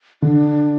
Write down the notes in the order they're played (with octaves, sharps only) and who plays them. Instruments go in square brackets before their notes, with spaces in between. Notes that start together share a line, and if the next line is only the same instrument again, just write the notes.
[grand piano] D3 [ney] D4